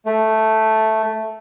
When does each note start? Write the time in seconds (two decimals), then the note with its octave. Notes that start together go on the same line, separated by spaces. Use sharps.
0.06 A3